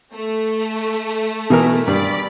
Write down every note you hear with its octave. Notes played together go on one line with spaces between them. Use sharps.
A3
B2 E3 A#4
G2 D5 B5